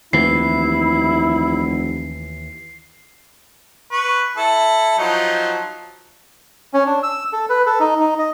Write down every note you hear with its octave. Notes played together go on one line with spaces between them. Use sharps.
F1 D#2 E3 E4 C7
B4 C#6
E4 A4
F3 F#3 D#4
C#4
D4
E6
A4
B4
A4
D#4
D#4
D#5